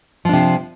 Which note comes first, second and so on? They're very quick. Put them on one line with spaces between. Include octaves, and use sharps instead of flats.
F3 D4 C3